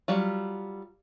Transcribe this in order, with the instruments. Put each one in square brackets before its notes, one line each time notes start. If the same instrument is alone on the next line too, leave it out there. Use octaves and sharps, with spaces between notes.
[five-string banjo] F#3 G3 F4